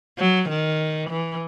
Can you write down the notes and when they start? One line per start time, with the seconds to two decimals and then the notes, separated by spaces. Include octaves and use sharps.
0.18 F#3
0.49 D#3
1.09 E3